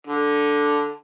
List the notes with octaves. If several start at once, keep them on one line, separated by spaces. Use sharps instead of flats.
D3